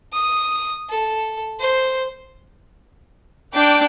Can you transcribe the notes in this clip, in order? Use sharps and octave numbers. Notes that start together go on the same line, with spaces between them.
D#6
A4
C5
D4 G5 D6